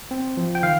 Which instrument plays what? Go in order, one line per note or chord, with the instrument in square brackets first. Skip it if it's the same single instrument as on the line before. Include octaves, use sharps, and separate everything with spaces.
[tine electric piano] C4
F3
G5
D#3 F5